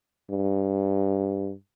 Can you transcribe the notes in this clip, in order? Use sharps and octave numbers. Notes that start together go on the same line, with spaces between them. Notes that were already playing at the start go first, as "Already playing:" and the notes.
G2